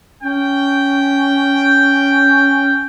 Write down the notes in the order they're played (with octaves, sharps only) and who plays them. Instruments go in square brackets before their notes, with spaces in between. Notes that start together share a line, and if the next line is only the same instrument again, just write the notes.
[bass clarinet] C#4 [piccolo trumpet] G5